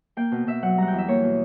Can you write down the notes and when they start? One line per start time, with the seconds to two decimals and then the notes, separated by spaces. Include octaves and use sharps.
0.17 A#3 G5
0.32 B2
0.47 B2 E5
0.62 F#3 F#5
0.77 G3 F#5 A#5
0.88 G5
0.93 E2
0.98 E5
1.08 A#3 C#5
1.23 B2